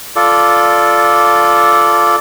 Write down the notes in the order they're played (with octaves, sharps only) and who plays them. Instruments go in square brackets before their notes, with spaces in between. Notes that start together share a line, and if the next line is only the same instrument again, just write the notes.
[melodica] F4 A4 D5